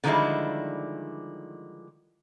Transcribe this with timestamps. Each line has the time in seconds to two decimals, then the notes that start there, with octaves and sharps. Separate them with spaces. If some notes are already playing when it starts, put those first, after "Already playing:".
0.04 D3 D#3 F3 G3 G#3 E4